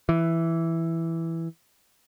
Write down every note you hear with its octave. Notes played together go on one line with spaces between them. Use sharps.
E3